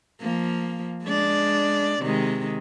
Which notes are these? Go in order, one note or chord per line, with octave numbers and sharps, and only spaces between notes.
F3 A#3
G#3 D4 D5
C3 D#3 G#3